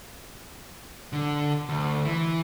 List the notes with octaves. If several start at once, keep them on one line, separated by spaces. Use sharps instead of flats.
D3
D2
E3